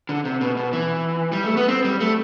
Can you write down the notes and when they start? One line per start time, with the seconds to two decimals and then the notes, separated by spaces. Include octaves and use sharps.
0.09 D3
0.25 C3
0.41 B2
0.57 B2
0.73 E3
1.32 G3
1.44 A3
1.57 B3
1.68 C4
1.84 G3
2.00 A3